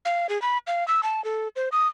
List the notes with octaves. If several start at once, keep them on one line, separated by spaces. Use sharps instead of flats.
F5
G#4
B5
F5
E6
A5
A4
C5
D#6